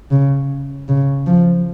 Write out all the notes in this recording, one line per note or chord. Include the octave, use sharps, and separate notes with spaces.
C#3
C#3
F3